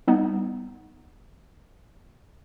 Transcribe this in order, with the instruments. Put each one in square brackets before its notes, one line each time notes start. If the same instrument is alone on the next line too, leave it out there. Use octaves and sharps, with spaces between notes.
[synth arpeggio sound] G3 B3 D#4